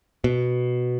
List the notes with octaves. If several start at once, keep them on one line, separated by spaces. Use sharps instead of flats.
B2